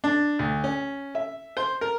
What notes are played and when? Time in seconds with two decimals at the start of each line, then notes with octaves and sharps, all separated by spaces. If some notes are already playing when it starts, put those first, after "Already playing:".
0.04 D4
0.39 D2
0.64 C#4
1.15 E5
1.57 C5
1.81 A#4